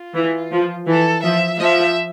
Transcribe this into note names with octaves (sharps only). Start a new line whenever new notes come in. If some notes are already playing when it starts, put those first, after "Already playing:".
Already playing: F4
E3
F3
E3 A4
F3 E5
F3 E5